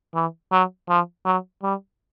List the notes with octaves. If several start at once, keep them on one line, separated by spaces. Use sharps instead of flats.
E3
F#3
F3
F#3
G3